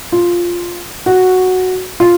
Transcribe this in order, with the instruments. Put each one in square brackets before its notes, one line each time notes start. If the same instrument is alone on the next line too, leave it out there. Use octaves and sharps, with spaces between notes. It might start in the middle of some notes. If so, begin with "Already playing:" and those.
[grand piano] F4
F#4
F4